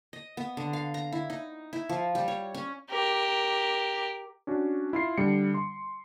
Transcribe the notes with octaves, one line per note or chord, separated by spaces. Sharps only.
D#5
B3
D3
F5
A#5
E4
D#4
E4
F3
G3
C#5
C#4
G4 A#4
C#4 D4 F#4
E4 F4 C7
D3 G3 C#7
C6